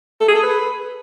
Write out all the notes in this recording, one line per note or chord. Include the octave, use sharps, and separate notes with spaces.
A4
G#4
A4
B4